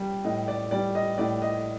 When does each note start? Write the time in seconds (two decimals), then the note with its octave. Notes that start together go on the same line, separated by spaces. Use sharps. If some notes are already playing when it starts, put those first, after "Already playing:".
Already playing: G3 D5
0.25 A2 D#5
0.48 D5
0.71 G3 D5
0.95 D#5
1.18 A2 D5
1.42 D#5